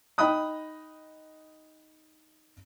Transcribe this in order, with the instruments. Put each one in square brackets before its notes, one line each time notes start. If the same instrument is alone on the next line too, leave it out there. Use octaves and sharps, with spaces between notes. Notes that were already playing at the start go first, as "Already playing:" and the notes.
[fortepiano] D#4 D#5 G5 B5 D#6 F#6